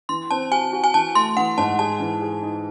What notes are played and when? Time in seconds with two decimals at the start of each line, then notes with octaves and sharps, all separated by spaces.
0.09 E3 C6
0.31 C4 A5
0.52 F#4 G#5
0.73 F#4
0.84 G#5
0.94 E3 A5
1.15 A3 C6
1.37 E3 F#5
1.58 G#2 A5
1.79 G#4 A5
2.00 E3
2.22 G#4
2.42 D#4